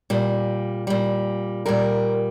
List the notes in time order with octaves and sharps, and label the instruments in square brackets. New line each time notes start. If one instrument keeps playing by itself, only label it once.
[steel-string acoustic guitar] A#2 G3
A#2 G3
A#2 G3 A#4